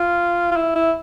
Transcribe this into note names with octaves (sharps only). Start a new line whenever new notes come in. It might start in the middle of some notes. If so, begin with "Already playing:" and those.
Already playing: F4
F4
E4
E4